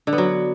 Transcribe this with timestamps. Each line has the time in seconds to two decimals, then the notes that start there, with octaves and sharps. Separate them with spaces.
0.07 D3
0.13 B3
0.18 F#3